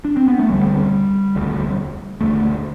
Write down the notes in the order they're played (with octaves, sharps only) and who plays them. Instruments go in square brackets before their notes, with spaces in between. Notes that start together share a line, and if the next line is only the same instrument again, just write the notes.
[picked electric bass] D4
C4
B3
A3
E1 D2 D3 G3
E1 D2 D3
E1 D2 D3 A3